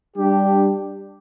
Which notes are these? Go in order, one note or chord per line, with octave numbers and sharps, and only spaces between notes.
G3 D4 G4